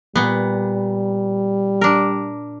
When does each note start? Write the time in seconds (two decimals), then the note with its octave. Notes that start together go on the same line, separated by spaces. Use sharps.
0.16 A#2 G3 B3
1.81 D4 A#4